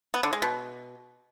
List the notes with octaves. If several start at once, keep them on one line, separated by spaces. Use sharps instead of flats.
B3
D3
G#3
B2